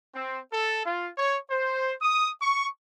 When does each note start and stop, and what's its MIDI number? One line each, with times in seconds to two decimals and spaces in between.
0.15 0.40 60
0.53 0.85 69
0.86 1.10 65
1.18 1.38 73
1.51 1.92 72
2.02 2.29 87
2.42 2.67 85